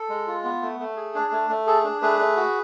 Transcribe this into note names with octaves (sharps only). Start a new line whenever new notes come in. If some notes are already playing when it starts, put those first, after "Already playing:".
Already playing: A4
G#3
F4
B3
A3
A3
G#4
D4
A3
A3
G#4 A4
D4
A3 G#4 B4
A3
F#4